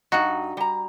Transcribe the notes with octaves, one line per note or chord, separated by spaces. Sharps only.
G2 D#4 F#4
G3 A#5